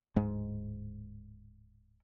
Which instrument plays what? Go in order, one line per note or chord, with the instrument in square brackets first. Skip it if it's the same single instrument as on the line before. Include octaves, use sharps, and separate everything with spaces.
[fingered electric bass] D1 G#2 G#3